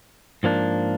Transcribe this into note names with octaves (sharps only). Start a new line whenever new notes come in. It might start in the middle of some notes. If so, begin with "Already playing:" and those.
G#2 F3 A#3 D4